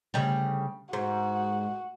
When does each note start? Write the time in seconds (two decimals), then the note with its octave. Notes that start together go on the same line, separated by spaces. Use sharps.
0.14 D2 C#3 G3
0.93 G#2 F#4